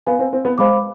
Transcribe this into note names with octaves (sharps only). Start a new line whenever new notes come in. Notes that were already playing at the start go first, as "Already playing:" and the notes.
B3 B4 F5 G#5
C4
C4
B3
G#3 C5 F5 B5 D6